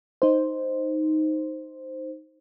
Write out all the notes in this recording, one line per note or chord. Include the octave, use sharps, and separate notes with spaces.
D#4 C5